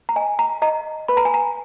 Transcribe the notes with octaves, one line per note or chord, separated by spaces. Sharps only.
A#5
D#5 G#5
A#5
D#5 A#5
B4 B5
A#5
G#5
A#5